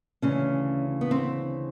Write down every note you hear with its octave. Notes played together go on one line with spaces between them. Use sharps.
D2 C#3 E3 C#4
B3
C4